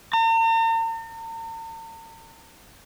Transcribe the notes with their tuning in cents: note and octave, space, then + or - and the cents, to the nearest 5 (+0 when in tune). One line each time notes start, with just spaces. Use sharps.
A#5 -45